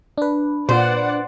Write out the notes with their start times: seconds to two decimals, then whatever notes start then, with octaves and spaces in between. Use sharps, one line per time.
0.18 D4 B4
0.69 A#2 F4 C5 D5 F#5